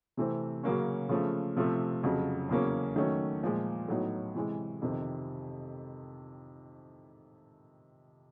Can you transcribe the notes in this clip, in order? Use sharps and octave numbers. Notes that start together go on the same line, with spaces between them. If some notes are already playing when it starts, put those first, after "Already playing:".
C3 E3 A3 C4
C#3 F#3 A#3 C#4
C#3 F3 A3
C3 F3 A3
F2 C#3 F#3
E2 C#3 F#3 A#3 C#4
D#3 F#3 A3 C#4
A#2 F3 G#3
A2 F#3 B3 D#4
C3 E3 G#3
F2 C3 D#3